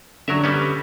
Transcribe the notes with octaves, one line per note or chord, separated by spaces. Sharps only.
D3 F#3 A#4 E5
G3 B3 C#4